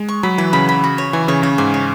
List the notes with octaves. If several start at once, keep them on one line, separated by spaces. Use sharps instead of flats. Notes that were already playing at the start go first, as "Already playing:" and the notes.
Already playing: G#3
C#6
F#3 B5
E3 B4
C#3 B5
B5
F#4
C#5
E3 G#5
C#3 C#5
C#3 C#5
G#2 G#5
C#5